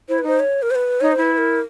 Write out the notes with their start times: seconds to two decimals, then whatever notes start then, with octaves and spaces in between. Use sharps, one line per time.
0.09 E4 C5
0.18 B4
0.23 D#4 C5
0.40 C#5
0.62 A#4
0.71 C5
0.75 B4
1.01 D#4 C#5
1.12 C5
1.17 E4 B4
1.33 B4
1.38 A#4